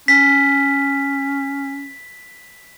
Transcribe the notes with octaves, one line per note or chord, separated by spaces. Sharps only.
C#4 B6